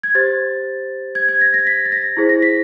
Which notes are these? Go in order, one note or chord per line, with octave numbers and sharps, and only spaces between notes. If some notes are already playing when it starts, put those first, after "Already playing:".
G#6
G4 C5 A6
G#6
G#6
A#6
A#6
B6
A6
A#6
E4 G#4 C5
A#6
B6